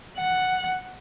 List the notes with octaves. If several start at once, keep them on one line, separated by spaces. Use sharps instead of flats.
F#5